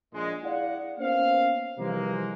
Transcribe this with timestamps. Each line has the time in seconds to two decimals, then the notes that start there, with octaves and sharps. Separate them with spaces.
0.12 A#1 G#3
0.44 E4 G#4 D5 F5 F#5
0.98 A#3 B3 C#4 C5 F5
1.78 C3 E3 F3 G3 G#3 A#3